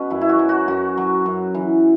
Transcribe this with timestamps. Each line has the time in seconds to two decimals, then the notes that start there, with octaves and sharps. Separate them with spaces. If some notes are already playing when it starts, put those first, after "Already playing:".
Already playing: B2 B3 C#4 F#4 G#4
0.10 F#2 E4
0.21 E4
0.29 F#4
0.39 F#3
0.49 F#4
0.68 F#2 F#4
0.98 F#3
1.26 F#2
1.55 E3